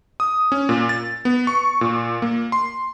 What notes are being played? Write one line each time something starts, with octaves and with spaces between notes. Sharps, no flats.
D#6
C#4
A#2
A6
B3
C#6
A#2
A#3
C6